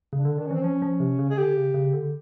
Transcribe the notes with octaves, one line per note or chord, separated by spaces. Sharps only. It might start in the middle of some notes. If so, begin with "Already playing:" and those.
C#3 D4
D3
D#3 D4
C#4
E3 C4
F3 C#4
F3
C3
C#3
G#4
D3 G4
C#3
C#3
D3